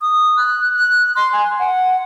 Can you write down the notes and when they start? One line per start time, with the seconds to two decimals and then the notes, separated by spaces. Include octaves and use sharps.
0.02 D#6
0.37 F#6
0.75 F#6
1.16 C6
1.33 G#5
1.59 F#5